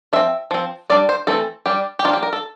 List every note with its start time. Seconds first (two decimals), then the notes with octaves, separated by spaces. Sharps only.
0.13 F3 C4 E5
0.51 F3 C4
0.90 G3 D4 D5
1.09 C5
1.27 E3 A3 C4 A4
1.66 G3 D4 G4
1.99 G4
2.04 F3 A#3 D4 F4
2.13 G4
2.23 A#4
2.33 A4